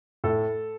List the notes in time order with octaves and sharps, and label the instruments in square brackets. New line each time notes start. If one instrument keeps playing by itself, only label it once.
[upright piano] A2 A4